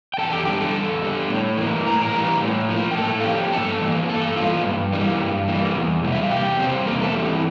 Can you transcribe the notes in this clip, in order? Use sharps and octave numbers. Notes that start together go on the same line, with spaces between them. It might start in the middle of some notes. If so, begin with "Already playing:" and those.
G5
E2 A4 A5
G4 G5
D3 G3 G4 G5
A4 A5
E2
D3 G3
A2
E3 G3 A#3
A2 A#5
A#4 A#5
E3 G3 A#3
A2
F3 A#3
G5
A2 A4 A5
F5
F3 A#3 G4 G5
G2 A4 A5
E3 A#3
G2 A4 A5
E3 A#3 F4 F5
G2
E3 G3 A#3
G2
E3 G3 A#3
E2
C3 G3 A#3
E5
F5
E2 G4 G5
C3 G3 A#3 C4 C5
E2 A#3 A#4
A3 A4
E3 G3 C4 G4
E4